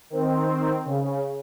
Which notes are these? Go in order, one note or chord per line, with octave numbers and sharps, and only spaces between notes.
D#3 C4
C#3